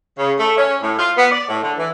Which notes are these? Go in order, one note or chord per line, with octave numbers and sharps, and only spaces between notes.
C#3
A3
C#4
A2
F4
B3
D5
A2
D3
E3